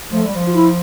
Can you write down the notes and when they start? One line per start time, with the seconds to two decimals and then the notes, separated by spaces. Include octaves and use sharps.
0.11 F3 A3
0.23 G3
0.34 F3
0.47 F4
0.53 E4